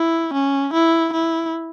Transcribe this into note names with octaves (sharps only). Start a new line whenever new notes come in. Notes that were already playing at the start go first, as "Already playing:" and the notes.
Already playing: E4
C#4
E4
E4